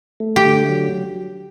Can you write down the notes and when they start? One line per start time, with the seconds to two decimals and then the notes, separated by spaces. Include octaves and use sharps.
0.20 A3
0.36 G4
0.45 D3
0.69 F#3